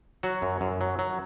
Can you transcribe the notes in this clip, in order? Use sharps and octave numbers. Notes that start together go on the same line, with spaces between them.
F#3 F#4
F#2
F#2
F#3
F#3